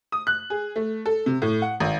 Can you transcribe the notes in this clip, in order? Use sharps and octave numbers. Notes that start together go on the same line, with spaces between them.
D#6
F#6
G#4
A3
A4
C3
A2
F#5
G#1